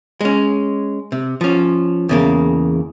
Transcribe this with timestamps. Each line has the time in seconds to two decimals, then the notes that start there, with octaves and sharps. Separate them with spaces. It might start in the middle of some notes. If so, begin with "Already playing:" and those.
0.21 G#3 C#4
1.12 C3
1.41 F3 C#4
2.09 E2 C#3 A#3